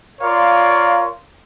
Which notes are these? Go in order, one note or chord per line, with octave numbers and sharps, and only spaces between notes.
F4 A#4 C#5 D5 F5